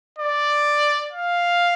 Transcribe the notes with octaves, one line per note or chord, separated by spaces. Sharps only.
D5
F5